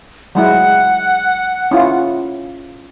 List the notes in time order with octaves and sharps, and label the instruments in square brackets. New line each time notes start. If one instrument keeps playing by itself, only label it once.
[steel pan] F#3 G#3 E4 [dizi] F#5
[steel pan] C#4 E4 F4